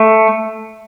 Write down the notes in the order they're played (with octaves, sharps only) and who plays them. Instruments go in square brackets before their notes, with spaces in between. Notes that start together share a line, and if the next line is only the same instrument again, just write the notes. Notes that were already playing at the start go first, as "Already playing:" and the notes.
Already playing: [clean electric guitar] A3